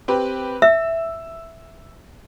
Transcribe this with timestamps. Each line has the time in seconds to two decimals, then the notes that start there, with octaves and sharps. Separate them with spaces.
0.08 C4 G4 B4
0.62 E5 E6